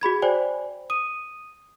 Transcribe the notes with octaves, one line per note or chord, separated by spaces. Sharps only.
F#4 G#4 B5 G#6
C5 D5 G5 G#5
D#6 D#7